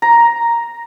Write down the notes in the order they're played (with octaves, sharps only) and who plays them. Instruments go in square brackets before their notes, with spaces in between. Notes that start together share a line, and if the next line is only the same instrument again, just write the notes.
[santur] A#5